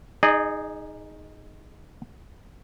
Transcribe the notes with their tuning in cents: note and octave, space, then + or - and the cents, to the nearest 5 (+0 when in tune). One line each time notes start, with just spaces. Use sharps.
D#4 +0 G#4 +0 D#5 -45